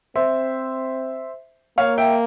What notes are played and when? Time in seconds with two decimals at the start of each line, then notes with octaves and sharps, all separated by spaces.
0.16 C4 C5 E5
1.78 A#3 C#5 F5
1.98 E5 G5